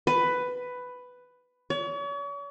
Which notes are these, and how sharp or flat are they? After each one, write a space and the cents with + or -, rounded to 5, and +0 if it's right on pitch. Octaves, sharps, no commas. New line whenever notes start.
B4 +10
C#5 +40